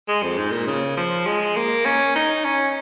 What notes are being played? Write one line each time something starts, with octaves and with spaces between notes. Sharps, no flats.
G#3
F2
G#2
A#2
C#3
F3
G#3
A#3
C#4
D#4
C#4